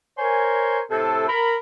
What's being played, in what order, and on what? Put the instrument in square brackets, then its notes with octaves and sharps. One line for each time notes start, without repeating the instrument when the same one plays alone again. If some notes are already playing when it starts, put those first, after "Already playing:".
[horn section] A#4 C5 C#5 G#5
A2 C3 A4
A#4 B5